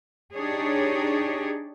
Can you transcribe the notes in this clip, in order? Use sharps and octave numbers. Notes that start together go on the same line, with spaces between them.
D4 D#4 G4 G#4 C#5